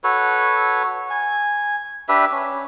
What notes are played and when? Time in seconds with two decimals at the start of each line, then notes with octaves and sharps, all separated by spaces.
0.04 F#4 A4 B4 C#5
1.10 G#5
2.09 D4 G4 B4 E5
2.31 C#4